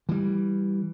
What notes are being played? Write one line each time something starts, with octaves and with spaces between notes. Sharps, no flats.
E3 G3